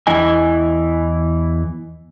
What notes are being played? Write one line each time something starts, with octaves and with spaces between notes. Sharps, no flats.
E2 E3 E4 D#5 G#5